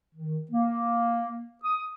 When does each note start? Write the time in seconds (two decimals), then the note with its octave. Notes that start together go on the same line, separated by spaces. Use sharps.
0.15 D#3
0.50 A#3
1.64 D#6